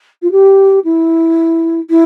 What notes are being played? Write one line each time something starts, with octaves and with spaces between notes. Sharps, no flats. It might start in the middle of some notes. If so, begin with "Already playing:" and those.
F4
G4
E4
E4